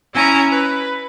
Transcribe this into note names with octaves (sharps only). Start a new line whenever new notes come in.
C#4 E4 G#5 A#5
B4